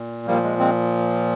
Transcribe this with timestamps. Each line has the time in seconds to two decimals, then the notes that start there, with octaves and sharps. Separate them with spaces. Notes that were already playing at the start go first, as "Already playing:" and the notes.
Already playing: A#2
0.27 A#2 F3 G3 A#3
0.44 G#3
0.59 G#3 C4